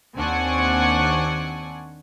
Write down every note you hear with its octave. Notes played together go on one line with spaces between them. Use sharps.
D#2 C4 D4 F#5 G#5 C#6